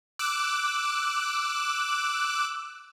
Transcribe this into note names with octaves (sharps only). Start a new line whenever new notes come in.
D6 E6 F#6